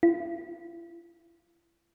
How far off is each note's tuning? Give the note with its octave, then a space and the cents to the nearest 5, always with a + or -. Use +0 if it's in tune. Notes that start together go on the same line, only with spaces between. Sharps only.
E4 +45